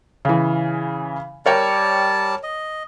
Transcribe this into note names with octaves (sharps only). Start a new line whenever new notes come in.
C#3 E3
G3 A#4 C#5 D5 G5 A5
D#5